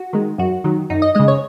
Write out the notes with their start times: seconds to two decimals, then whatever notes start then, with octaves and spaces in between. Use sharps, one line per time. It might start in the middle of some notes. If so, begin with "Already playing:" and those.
Already playing: F#4
0.13 D#3 G#3
0.38 F#2 F#4
0.64 D#3 F#3
0.90 F#2 D#4
1.02 D#5
1.15 C#3 G#3 D#5
1.28 C#5